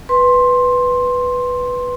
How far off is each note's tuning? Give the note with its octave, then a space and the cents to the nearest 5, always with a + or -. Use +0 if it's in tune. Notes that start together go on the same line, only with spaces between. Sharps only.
B4 +0 C6 +10